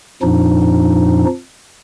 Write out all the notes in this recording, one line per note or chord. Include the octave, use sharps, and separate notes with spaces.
F2 A#2 F3 D4 D#4